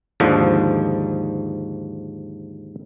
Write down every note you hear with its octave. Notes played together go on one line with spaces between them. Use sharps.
D#2 G#2 D3 F3